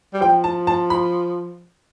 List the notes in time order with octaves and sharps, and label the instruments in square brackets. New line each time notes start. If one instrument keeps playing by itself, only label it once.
[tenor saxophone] G3
[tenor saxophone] F3 [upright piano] G5
[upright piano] A5
A5
B5